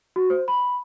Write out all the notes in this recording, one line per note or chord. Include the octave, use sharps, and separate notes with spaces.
F#4
C5
B5